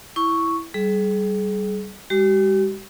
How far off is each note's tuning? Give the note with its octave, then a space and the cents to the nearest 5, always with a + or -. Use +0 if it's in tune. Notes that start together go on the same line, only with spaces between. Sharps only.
E4 +0 C#6 +0
G3 -15 G#4 +30
G#3 -45 G4 -40